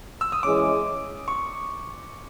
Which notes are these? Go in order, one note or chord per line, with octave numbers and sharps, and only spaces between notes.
E6
D#6
E3 G#3 C#4 D6
C#6